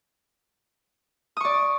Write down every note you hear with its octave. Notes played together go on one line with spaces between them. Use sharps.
D5 C#6 D#6